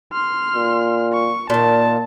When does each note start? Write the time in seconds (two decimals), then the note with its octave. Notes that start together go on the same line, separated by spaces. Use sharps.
0.13 C6 F6
0.56 A#2
1.13 C#6
1.50 A#2 D#3 A#3 A5